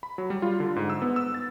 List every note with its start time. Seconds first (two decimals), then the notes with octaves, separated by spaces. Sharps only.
0.03 B5
0.18 F#3
0.30 G3
0.42 F4
0.60 D3
0.76 G#2
0.90 E6
1.02 B3
1.16 E6
1.35 A6